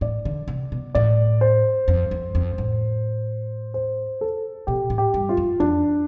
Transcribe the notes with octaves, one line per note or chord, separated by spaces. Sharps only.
A2 D5
D3
C3
B2
A2 D5
C5
F2
F2
F2
A2
C5
A4
B2 G4
A2
G4
G2
F4
F2
F2 D4